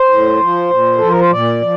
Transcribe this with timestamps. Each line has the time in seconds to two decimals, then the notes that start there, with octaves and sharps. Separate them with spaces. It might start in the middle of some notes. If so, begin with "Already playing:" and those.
Already playing: C5
0.09 A2
0.40 F3
0.70 A#2
0.98 F3 A4
1.09 A#4
1.20 C5
1.31 A#2 D5
1.62 F3